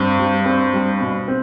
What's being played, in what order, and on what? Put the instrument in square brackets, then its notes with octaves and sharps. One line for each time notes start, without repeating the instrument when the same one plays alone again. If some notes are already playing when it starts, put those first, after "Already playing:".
Already playing: [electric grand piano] G2 [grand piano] C4
[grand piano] G3
C4
G3
B2
C4